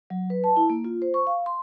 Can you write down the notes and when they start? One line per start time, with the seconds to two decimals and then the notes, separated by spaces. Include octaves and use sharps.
0.10 F#3
0.30 B4
0.44 A5
0.57 E4
0.70 A#3
0.84 F4
1.02 C5
1.14 C#6
1.27 F5
1.46 C6